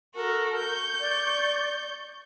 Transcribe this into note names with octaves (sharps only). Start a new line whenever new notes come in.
F#4 A4 A#4
C#6 G6
D5